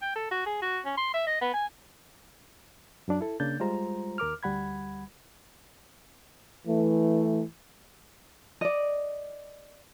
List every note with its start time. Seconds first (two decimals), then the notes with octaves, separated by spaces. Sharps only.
0.02 G5
0.16 A4
0.31 F#4
0.46 G#4
0.62 F#4
0.85 C#4
0.98 C6
1.14 E5
1.27 D#5
1.42 B3
1.54 G#5
3.08 F#2 F#3 D4 D5
3.21 E4 A4
3.40 C#3 A#3 D4 G6 A6
3.60 G3 G#3 F4 C5 A#5
4.18 D#2 A#4 D6 F6
4.43 D2 G3 F#5 B5 G#6
6.67 E3 A3
8.61 D5 D#5